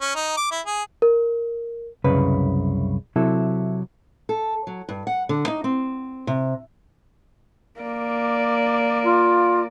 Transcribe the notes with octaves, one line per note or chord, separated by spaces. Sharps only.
C#4
D#4
D6
E4
G#4
A#4
C2 F#2 C#3 B4
C3 F#3 E4 A4
A4
F#3
G2
F#5
D3
D#4
C4
C3
A#3 D5
F4